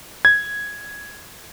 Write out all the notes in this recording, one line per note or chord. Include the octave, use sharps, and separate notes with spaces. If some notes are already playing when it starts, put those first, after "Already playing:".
G#6